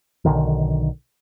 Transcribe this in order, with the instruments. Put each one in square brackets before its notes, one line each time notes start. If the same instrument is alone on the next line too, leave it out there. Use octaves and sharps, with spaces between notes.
[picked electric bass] B1 B2 D3 D#3